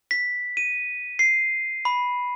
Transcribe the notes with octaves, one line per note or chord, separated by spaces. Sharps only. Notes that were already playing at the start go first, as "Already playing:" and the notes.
B6
D#7
C7
B5